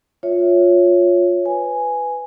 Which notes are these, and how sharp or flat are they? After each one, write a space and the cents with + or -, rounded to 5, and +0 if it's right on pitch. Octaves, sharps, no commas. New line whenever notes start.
F4 +15 C#5 +0 E5 +0
B4 +10 G#5 +0